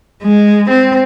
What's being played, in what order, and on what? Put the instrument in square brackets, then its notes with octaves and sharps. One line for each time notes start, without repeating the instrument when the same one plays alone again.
[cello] G#3
C4